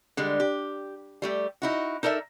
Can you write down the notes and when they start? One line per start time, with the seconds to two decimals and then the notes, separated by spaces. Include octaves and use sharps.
0.17 D3 G3 G#3
0.40 G4
1.22 G3 A3 G4
1.62 D#4 E4 F#4
2.03 D#4 A4 A#4 D5 E5